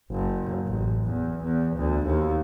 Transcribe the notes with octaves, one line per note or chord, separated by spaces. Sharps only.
F#1
A1
E2
E2
D2
D#2